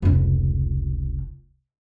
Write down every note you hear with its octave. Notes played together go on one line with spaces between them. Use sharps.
F1 C#2